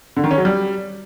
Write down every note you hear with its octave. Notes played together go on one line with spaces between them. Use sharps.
D3
D#3
C#4
F#3
G3